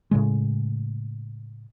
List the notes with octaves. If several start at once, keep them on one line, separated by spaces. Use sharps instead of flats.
A2 C#3 G#3